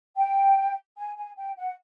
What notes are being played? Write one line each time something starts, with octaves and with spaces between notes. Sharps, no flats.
G5
G#5
G#5
G5
F#5